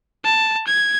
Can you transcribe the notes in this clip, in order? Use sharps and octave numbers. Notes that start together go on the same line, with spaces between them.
A5
G#6